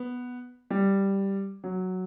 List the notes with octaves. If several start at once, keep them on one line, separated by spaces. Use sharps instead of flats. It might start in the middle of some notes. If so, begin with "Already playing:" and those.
Already playing: B3
G3
F#3